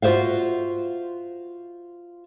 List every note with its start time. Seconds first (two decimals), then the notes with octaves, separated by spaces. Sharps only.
0.02 F4 F#4 A#4 C5 E5 F5